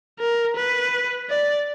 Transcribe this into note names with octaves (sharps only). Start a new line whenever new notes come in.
A#4
B4
D5